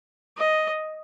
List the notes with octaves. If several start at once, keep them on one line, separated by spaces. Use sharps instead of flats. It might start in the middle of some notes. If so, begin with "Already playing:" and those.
D#5